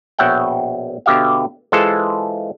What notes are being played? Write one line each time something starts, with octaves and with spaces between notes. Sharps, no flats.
A#1 B2 C#5 E5 F#5 G5
B2 D3 G4 E5 F5
E3 G#3 F4 G#4 A4 C5